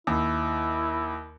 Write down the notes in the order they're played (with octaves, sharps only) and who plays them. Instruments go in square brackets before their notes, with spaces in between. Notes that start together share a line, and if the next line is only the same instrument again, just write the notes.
[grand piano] D#2 [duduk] E4